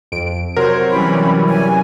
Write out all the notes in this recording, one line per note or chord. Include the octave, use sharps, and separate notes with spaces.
F2 D7
C3 F#3 A#4 C5 C#5
E3 G3 C#4 B5
G#5